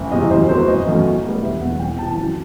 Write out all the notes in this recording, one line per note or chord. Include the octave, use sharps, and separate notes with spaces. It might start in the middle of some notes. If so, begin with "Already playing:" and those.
Already playing: F#1
E2 C3 E3 G3 D#5
F#2 C5
F#3 B3 C5
F#1 D#5
F#2 F#3 A3
B1
A2 G3 B3
E1 E5
E2 B2 F#3 F#5
C2 G5
C3 E3 A5
F#2